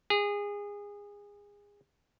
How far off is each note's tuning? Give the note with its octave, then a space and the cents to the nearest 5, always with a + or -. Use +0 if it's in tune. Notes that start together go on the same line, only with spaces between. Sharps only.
G#4 -25